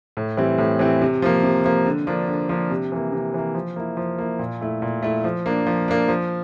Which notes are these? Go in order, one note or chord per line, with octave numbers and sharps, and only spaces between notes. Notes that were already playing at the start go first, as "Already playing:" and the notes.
A2
E3 G3 C4 E4
A2
E3 G3 C4 E4
C3
F3 A#3
C3
F3 A#3
D3
F3 A#3 D4
D3
F3 A#3 D4
C3
E3 A#3
C3
E3 A#3
F3
A#3 E4
F3
A#3 E4
A#2
A3 E4
A#2
A3 E4
F3
A#3 D4
F3
A#3 D4
F3